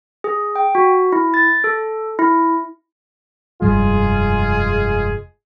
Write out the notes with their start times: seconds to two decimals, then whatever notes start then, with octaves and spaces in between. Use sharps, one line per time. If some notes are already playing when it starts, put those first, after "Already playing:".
0.24 G#4
0.56 G5
0.75 F#4
1.12 E4
1.34 A6
1.64 A4
2.19 E4
3.62 F1 G2 G3 G#3 F4 G#4